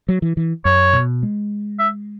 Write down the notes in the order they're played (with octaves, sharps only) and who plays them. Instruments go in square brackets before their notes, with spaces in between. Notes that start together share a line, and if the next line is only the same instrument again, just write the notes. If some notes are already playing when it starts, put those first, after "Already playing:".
[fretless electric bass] F#3
E3
E3
[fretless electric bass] F#2 [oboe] C#5
[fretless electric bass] B2
G#3
[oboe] E5